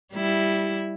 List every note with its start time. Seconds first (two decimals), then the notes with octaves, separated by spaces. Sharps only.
0.13 G3 E4